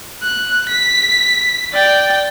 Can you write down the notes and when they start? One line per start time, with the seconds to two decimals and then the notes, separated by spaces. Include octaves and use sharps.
0.23 F#6
0.69 B6
1.73 D5 G5